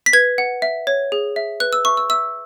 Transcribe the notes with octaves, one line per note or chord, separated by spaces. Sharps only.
B6
B4 G#6
F#5
E5
C#5
G#4
E5
B4 F#6
E6
E5 C#6
E6
E5 E6